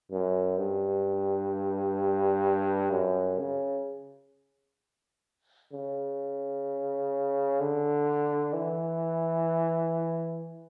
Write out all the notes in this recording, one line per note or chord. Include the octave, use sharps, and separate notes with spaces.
F#2
G2
F#2
C#3
C#3
D3
E3